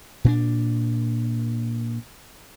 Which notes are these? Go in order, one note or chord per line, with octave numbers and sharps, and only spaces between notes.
A#2 C4 D4